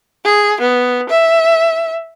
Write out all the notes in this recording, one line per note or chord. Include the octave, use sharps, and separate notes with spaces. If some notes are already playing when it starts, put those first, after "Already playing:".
G#4
B3
E5